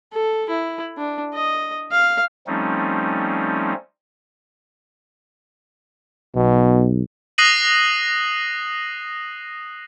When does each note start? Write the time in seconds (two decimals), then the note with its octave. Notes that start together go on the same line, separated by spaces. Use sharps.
0.12 A4
0.49 E4
0.98 D4
1.34 D#5
1.91 F5
2.47 F3 G3 A3 C4 C#4 D#4
6.35 B1 B2
7.38 D#6 F#6 A#6 C7 D#7 F#7